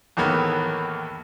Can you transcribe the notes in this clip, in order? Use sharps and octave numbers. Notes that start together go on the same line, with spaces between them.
E2 A2 D#3 E3 A#3 B3